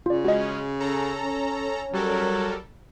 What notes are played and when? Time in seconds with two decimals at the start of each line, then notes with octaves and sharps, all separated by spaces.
0.06 C#3 F4 D5
0.24 G#3 C#4 F#4 D#5
0.80 C#4 A4 C#5 A#5
1.93 F#3 G3 A4 A#4